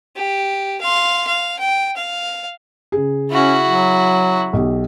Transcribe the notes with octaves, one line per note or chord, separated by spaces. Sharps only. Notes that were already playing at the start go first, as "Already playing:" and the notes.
G4
F5 C6
F5
G5
F5
C#3 G#4
C#4 E4 F#4
F#3
B1 G4